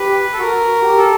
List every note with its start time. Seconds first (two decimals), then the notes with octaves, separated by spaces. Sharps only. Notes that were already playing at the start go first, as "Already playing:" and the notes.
Already playing: G4 B4
0.33 A4
0.39 F#4 A#4
0.68 F#4
0.82 G4
0.98 A4